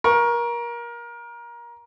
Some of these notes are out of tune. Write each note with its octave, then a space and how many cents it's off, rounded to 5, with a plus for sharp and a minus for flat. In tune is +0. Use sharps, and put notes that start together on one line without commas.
A#4 +25 C#6 +0